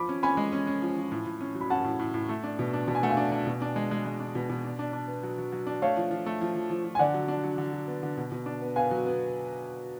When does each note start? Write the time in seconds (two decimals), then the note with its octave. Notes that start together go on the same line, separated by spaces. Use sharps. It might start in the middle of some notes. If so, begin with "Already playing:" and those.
Already playing: F3 B5 D6
0.09 C#4
0.23 C#4 G#5 B5
0.37 G#3
0.53 C#4
0.67 C#4
0.82 F3
0.97 F3
1.11 A2
1.27 A2
1.41 C#4
1.55 F#3
1.61 B5
1.70 C#4 F#5 A5
1.84 A2
1.99 A2
2.14 A2
2.29 A3
2.44 D4
2.59 B2
2.73 D4
2.88 B2 A5
2.95 G#5
3.02 A3 F#5
3.09 F5 G#5
3.17 D4
3.32 D4
3.47 B2
3.62 D4
3.76 G#3
3.91 G#3
4.06 G#3
4.20 D4
4.35 B2
4.50 B2
4.64 D4
4.79 D4
4.93 D4
5.08 B3
5.23 F#3
5.38 F#3
5.52 F#3
5.67 D4
5.82 A3 C#5 F5
5.97 F3
6.11 F3
6.26 A3
6.41 F3
6.55 F3
6.70 F3
6.85 F3
6.95 G#5
6.99 D3 D5 F#5
7.14 F#3
7.28 D4
7.44 F#3
7.58 D3
7.73 F#3
7.87 B3
8.03 D3
8.17 B2
8.32 B2
8.46 D4
8.62 B3
8.76 B3 F5 G#5
8.91 F#3
9.06 B3